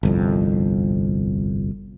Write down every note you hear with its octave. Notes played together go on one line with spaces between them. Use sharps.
G1 C2 F2